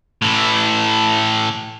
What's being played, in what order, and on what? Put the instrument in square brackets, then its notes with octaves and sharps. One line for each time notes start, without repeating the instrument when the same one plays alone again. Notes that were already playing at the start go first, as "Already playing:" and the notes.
[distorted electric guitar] A2 E3